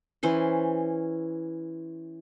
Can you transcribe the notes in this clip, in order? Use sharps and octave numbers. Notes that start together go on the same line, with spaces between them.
E3 C#4 C5